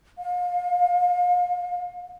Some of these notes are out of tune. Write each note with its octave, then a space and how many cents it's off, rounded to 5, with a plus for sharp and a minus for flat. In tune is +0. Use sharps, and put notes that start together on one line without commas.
F5 +35